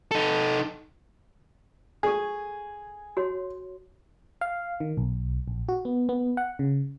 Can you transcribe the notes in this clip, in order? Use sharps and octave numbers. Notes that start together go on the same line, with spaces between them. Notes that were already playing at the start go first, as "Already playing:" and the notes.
D#4 A4
G#4 A4 G#5 C#6
F#4 C#5 C6
F5
D#3
B1
A#1
F#4
B3
B3
F#5
C#3